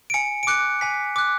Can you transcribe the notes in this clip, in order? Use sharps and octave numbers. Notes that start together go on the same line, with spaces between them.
D7
G#5 C#7
D7
D6 F#6 C#7
G#5 B6
D6 F#6